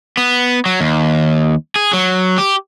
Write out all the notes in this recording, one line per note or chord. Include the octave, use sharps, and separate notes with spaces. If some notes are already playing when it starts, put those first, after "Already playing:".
B3
F#3
D#2
G#4
F#3
G4